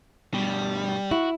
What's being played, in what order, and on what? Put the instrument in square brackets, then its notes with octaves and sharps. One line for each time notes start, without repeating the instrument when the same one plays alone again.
[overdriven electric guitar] G2 B2 [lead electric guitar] G3
[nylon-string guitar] E4 [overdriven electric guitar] F#4